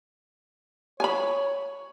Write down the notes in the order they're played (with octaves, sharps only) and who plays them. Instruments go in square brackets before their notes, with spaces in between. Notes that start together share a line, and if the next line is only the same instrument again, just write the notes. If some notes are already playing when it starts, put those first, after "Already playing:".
[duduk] C#5 [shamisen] G#5 A#5 B5